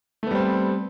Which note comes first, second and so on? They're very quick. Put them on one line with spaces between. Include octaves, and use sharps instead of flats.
A3 B3 G3 C4